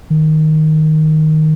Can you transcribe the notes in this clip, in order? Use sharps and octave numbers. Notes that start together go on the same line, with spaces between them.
D#3